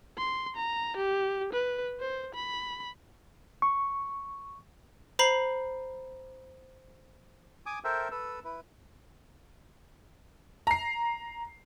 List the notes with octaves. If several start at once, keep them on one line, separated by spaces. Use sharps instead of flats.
C6
A#5
G4
B4
C5
B5
C#6
C5 A#5 B5 C7 F#7
G#5 D6 D#6
A4 A#4 C5 E5 G5
A4 B4 E6
E4 B4
A#5 C7